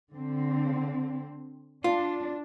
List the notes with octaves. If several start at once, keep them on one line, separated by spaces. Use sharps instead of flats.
D3 C4
D4 F4